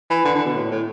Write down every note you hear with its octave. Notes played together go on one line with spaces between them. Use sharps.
E3
D3
D3
B2
A2
A2